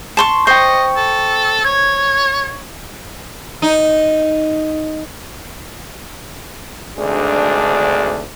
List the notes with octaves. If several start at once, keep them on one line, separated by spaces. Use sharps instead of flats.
A5 C6 C#6
C5 D#5 G5 C#6
A4
C#5 G#6
D#4
G#1 D2 D4 G#4